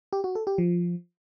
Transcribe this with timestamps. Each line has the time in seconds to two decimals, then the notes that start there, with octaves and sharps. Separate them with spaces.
0.13 G4
0.24 F#4
0.35 A4
0.47 G4
0.58 F3